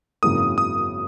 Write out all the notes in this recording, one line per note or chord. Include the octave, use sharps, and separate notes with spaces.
G#1 F#2 C#3 E3 A#3 D#6
D#6